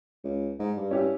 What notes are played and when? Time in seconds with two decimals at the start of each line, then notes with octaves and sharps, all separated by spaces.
0.24 C#2
0.59 G#2
0.77 G2
0.91 C#4 E4 G4